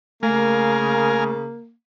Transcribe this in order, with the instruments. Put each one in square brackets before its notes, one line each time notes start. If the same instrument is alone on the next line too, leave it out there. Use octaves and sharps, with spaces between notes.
[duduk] C#3 [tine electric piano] A3 [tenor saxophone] A#3 [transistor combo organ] A#4 F5 G#5